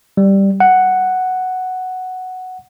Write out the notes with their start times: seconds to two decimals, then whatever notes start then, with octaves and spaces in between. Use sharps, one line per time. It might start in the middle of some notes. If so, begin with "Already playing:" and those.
0.17 G3
0.60 F#5